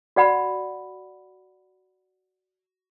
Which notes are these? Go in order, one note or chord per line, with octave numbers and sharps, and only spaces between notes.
F#4 D5 F#5 B5